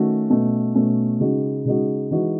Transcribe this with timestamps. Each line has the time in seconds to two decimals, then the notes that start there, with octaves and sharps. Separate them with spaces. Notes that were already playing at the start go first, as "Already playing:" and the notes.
Already playing: D#3 A3 C#4 F#4
0.30 B2 A3 C#4
0.75 B2 A3 C#4
1.20 C#3 G#3 D#4 F#4
1.65 C#3 G#3 D#4 F#4
2.11 E3 G#3 D#4 F#4